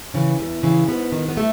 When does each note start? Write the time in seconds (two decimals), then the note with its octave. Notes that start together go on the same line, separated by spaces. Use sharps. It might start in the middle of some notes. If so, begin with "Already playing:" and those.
0.14 C#3 E3
0.39 E2
0.63 C#3 E3
0.88 G#2 B3
1.12 D#3
1.28 B3
1.37 A3